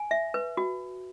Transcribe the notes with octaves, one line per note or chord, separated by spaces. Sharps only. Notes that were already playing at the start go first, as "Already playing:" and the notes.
Already playing: G#5
E5
B4
F#4